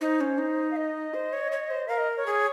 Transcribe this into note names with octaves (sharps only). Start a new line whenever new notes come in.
D#4 C5
C#4
D#4
F5
D#5
C5
C#5
C#5
C5
A#4 F5
D#5
C#5
G#4